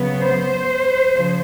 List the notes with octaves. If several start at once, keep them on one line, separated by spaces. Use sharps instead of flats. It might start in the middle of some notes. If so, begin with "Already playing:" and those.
Already playing: C#3 F#3 B3
C5
C#3 F3